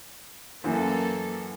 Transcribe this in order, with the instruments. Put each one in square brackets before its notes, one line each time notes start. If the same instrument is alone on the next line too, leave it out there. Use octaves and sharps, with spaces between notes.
[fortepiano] F#2 E3 [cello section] A#3 A4